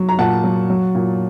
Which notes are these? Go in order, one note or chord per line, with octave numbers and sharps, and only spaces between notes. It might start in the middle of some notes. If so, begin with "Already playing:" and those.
Already playing: F#3
A#5
A#2 F#5 A5
F#3
F#3
A#2